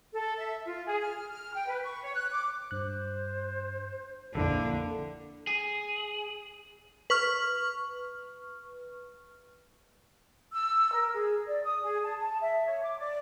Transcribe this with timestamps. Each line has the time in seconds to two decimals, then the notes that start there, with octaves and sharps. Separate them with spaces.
0.14 A4
0.38 E5
0.66 F4
0.87 G#4
1.01 F6
1.30 F6
1.54 G5
1.68 B4
1.84 C#6
2.03 C#5
2.14 F#6
2.32 D6
2.71 G2 C5 F#6
4.35 A#1 F2 D3 A#3 E4 A4
5.47 G#4
7.10 B4 C#6 F6
10.52 E6
10.94 A#4
11.14 G#4
11.47 D5
11.63 D#6
11.83 G#4
12.03 A5
12.20 A5
12.40 E5
12.66 C#5
12.83 D6
12.99 D5